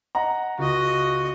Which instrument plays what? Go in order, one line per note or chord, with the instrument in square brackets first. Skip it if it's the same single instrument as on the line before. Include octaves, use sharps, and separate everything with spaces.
[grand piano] D#5 F#5 A#5
[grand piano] C#2 [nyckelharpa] F#4 D#5